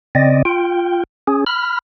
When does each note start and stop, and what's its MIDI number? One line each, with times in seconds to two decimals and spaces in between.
0.15 0.42 49
0.15 0.42 60
0.15 0.42 74
0.15 0.42 75
0.45 1.03 65
0.45 1.03 79
1.27 1.44 61
1.27 1.44 68
1.47 1.79 83
1.47 1.79 89